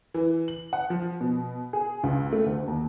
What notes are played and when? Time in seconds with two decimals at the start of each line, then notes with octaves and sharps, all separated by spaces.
0.14 E3
0.48 F#7
0.73 F#5
0.90 F3
1.21 B2
1.73 G#4
2.03 C#2
2.32 A3
2.46 D2
2.68 D#2